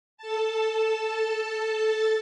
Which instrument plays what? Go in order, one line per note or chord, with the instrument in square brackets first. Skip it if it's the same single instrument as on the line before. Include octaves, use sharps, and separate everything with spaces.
[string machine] A4 A5